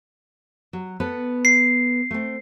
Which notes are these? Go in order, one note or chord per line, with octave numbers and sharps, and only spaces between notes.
F#3
B3 A4 B4
C7
A3 C4